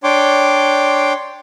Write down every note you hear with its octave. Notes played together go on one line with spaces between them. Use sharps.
D4 C#5 G5 C6 D6